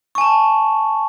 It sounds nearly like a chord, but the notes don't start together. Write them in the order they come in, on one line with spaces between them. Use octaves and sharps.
C#6 G#5 A5